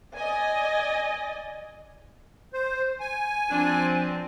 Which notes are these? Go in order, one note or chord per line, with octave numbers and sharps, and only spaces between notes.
D5 D#5 G#5
C5
G#5
F3 C4 D4